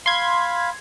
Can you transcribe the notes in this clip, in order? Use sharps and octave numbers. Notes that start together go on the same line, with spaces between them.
F5 B5 C6 G#6